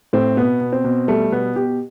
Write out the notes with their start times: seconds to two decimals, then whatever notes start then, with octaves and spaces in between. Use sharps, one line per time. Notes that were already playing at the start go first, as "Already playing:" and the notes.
0.13 A2 C4
0.37 B2 B3
0.61 B2
0.72 C4
0.84 B2
1.08 G3 A3
1.32 B2 B3
1.56 B2 G4